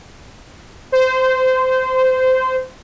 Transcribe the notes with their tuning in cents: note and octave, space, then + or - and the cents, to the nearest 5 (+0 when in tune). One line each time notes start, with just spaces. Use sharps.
C5 -20